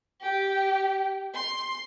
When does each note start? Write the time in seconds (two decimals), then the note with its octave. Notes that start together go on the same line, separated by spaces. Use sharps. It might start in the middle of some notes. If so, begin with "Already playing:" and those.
0.21 G4
1.34 C6